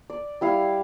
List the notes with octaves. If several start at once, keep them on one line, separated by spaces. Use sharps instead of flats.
D5
G3 E4 F5